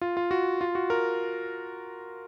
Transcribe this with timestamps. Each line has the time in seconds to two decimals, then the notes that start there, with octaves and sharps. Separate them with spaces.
0.01 F4
0.17 F4
0.31 F#4
0.61 F4
0.75 F#4
0.90 A#4